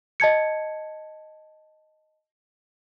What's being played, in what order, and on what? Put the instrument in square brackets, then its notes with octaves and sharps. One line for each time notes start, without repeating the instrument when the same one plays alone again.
[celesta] D#5 A5 G#6 C#7